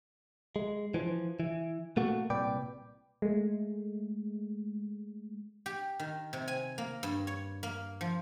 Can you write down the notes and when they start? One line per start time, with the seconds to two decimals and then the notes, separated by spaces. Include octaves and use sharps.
0.56 G#3
0.94 E3 F3
1.40 E3
1.97 A#2 A3 A#3 F#4
2.30 C2 A#2 B4 D5 G5
3.22 G#3 A3
5.66 G4
6.00 D#3
6.33 C3
6.48 G#5
6.78 A#3
7.03 G2
7.27 C#5
7.63 A#3
8.01 F3